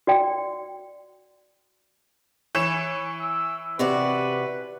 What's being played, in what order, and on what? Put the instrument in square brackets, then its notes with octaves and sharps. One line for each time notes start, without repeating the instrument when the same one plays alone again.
[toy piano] F#4 D5 G5
[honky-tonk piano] E3 C#5 E7
[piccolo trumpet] E6
[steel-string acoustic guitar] C3 F#4 D5 [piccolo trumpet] B4